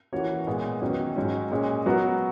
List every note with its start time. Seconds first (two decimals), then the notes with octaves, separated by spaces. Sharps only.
0.13 E3 A#3 C#4 F#4 C#5
0.47 A#2 G#3 B3
0.81 E2 D#3 F#3 C#4
1.16 G#2 F#3 C#4
1.51 A#2 G#3 C#4
1.86 F#3 B3 F#4 A#4